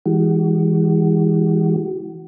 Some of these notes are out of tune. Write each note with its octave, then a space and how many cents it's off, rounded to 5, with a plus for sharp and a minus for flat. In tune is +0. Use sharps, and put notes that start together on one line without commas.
E3 -10 G#3 -25 F#4 +30